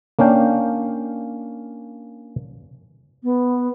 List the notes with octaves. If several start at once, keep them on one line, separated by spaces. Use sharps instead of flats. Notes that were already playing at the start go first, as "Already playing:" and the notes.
A#3 C#4 D4 F5 G5
B3